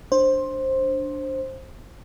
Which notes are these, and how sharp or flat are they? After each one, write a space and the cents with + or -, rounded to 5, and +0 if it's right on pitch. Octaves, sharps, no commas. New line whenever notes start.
D4 +0 C5 +15